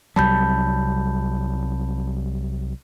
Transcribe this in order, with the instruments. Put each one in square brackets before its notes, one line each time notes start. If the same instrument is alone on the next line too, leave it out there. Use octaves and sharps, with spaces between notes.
[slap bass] C2 F#3 G3 [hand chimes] A5 B5 G6